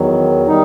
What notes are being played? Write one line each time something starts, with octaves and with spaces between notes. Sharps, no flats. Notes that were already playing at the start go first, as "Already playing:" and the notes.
Already playing: E2 D#3 F#3
D#3 G3 D#4